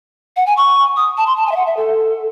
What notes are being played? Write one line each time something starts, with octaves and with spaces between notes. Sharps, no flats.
F#5
G#5
C#6
D#6
A5
C6
A5
G#5
E5
F#5
E5
A4